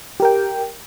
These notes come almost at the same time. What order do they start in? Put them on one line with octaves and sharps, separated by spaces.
G4 A#4 G5